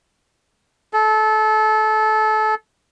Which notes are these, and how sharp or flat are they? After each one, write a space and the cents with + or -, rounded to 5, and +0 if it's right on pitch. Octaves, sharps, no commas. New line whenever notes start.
A4 -25